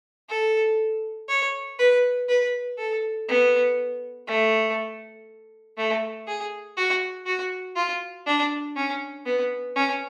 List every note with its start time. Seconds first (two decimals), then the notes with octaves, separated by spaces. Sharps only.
0.29 A4
1.29 C#5
1.79 B4
2.29 B4
2.78 A4
3.28 B3
4.27 A3
5.77 A3
6.27 G#4
6.77 F#4
7.26 F#4
7.76 F4
8.26 D4
8.76 C#4
9.26 B3
9.76 C#4